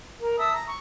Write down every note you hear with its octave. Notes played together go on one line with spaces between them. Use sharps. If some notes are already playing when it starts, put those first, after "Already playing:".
A#4
E5 A5 D#6 E6
A#5
C#6